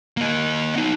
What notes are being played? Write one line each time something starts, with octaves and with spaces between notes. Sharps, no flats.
A#3 D#5
B3 D#4